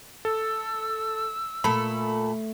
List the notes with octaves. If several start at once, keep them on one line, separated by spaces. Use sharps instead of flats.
A4 E6
A#2 A3 A4 B5